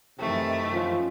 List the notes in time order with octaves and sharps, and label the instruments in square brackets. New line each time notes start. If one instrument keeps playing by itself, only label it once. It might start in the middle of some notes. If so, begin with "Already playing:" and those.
[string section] F#2 D#3 E3 [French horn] C3 [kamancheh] A3
[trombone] F3 [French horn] C#4